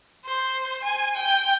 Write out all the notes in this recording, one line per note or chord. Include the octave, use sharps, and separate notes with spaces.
C5
G#5
G5